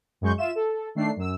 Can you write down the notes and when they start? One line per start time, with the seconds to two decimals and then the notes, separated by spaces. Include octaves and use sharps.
0.21 F#2 G#3 C#6 G6
0.38 F4 E5 E7
0.55 A4
0.95 D#3 A3 D4 C7
1.16 F#2 E6